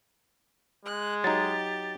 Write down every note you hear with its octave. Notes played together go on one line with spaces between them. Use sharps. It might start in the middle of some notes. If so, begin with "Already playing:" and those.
G#3 F#6
F#3 D#4 G4 A6